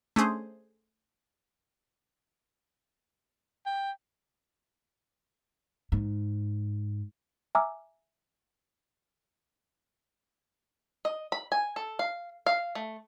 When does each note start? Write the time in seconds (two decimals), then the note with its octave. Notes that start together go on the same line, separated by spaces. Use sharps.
0.16 A3 C#4 D4 G#4 C5
3.66 G5
5.92 G#2
7.55 E5 G#5 A#5 D6 E6 F6
11.05 D#5
11.32 B5
11.52 G#5
11.76 A4
11.99 F5
12.46 F5
12.75 A3